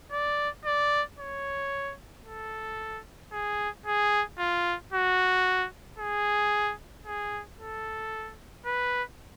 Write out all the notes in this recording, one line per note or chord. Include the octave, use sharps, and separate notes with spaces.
D5
D5
C#5
A4
G#4
G#4
F4
F#4
G#4
G#4
A4
B4